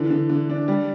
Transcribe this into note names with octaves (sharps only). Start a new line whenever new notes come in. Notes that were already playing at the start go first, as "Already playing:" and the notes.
Already playing: D3 E3
D3
D3
D4
G3